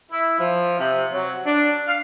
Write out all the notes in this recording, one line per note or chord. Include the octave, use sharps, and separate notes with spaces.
E4
F3
C3
F#3
D4
F5